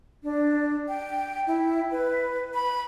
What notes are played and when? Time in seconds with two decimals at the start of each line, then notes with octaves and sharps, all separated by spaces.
0.23 D4
0.88 G5
1.47 E4
1.91 B4
2.54 B5